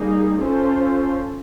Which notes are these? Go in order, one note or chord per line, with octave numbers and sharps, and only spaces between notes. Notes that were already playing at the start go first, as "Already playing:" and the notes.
Already playing: G3 A#3 D#4 G#4
C#4 F4 A4 C5